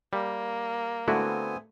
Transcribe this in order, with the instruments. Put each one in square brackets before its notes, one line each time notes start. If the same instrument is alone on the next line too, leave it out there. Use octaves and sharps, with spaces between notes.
[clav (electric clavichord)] G3 [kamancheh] A#3
[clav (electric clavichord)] D3 E4 F#4 [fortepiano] A3 [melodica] B3 C4 G#5